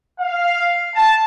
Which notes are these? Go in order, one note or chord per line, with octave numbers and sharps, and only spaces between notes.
F5
A5